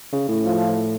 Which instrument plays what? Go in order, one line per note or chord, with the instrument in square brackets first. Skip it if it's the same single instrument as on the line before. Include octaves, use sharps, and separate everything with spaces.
[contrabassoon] C#3
A2
[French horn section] F3